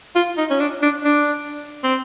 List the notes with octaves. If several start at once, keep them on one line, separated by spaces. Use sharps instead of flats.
F4
D#4
C#4
D4
D4
D4
C4